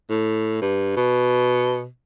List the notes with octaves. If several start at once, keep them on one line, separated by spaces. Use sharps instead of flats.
A2
G2
B2